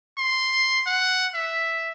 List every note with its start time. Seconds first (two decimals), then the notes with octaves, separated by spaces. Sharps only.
0.18 C6
0.86 F#5
1.35 E5